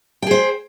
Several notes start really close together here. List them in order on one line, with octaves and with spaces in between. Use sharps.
G5 G#4 C5